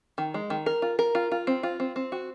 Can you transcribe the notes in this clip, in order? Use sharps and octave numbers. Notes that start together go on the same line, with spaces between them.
D#3
G#3
D#3
A#4
F4
A#4
F4
F4
C4
F4
C4
C4
F#4